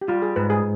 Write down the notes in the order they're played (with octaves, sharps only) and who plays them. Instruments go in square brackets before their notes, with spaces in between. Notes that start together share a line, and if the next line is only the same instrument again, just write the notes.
[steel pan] G4
[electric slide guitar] G3 [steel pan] F4
[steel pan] G#4
[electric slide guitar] G#2 [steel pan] B4
[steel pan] G#4